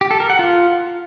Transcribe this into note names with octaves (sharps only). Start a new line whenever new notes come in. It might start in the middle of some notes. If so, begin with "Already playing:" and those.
G4
A4
A#4
F#5
F4